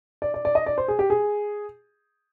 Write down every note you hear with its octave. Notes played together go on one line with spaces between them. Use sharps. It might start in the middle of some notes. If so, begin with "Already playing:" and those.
D5
D5
D5
D#5
D5
C5
G#4
G4
G#4